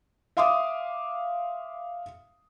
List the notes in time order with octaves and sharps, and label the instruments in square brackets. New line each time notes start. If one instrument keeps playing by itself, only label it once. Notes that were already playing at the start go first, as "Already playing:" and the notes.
[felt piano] E5 F5 C6 D6 D#6